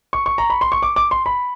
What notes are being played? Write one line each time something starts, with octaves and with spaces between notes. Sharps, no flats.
C#6
C#6
A#5
B5
C6
C#6
D6
D6
C6
B5